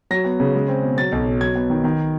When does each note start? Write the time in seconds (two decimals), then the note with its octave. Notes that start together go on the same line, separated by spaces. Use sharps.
0.11 F#3 A#6
0.25 B3
0.40 C#3
0.55 G#3
0.68 C4
0.82 B2
0.97 F#3 A6
1.12 B1
1.26 B2
1.40 F#3 G#6
1.55 B3
1.70 D#3
1.84 D#3